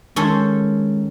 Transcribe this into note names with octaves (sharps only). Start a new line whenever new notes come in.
D#3 G#3 C#4 A4 C5